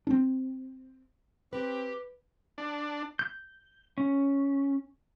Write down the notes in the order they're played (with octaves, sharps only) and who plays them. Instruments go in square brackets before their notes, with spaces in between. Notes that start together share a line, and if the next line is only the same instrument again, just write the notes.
[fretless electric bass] C4 D4
[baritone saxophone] C4 [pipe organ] G4 [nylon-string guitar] B4
[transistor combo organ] D4
[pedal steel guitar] G6
C#4